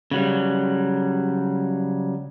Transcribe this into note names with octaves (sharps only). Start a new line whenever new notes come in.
C#3 F#3 G3